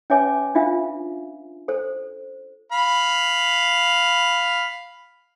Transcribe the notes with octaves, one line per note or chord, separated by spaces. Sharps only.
C#4 B4 C#5 E5 G#5 D6
D4 F4 E5 F5
A4 C5
F5 B5